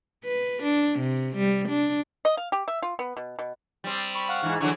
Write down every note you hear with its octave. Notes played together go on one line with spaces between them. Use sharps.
B4
D4
C3
G3
D4
D#5
F5
G4
E5
F4
B3
B2
B2
G3 C4
B5 C#6
F5 F#5 C#6
G#2 E3
D3 E3 F#3 C#6